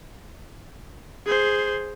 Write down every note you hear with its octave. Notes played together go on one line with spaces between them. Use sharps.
G#4 C5